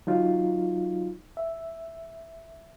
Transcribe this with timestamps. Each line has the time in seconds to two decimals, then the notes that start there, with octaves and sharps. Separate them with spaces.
0.07 F#3 D#4 F4
1.37 E5